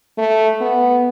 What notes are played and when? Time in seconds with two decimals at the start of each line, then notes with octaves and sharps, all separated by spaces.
0.18 A3
0.61 B3